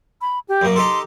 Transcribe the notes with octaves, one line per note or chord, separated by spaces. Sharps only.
B5
G4
F#2 A#3
D#4 G4 A4 C6